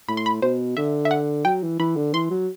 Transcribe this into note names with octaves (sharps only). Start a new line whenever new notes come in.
A2 B5
C6
B5
B2 C5
D3 E5
E5
F#5
F#3 G5
E3
E3 B5
D3
E3 C6
F#3